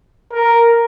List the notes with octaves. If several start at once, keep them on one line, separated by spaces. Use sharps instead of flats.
A#4